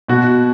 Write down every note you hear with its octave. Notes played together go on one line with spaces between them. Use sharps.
B2 F#4